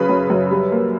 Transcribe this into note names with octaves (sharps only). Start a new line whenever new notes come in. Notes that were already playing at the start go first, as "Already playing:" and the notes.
Already playing: C#3 F#3 B4 B5
F#2
F#2
G3
A#3